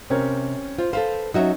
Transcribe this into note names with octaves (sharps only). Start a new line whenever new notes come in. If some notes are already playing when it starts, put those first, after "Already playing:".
C3 C4 C#4 A#4
F4 C5
A4 B4 C5 F5
F#3 C#4 D#4 F#4 E5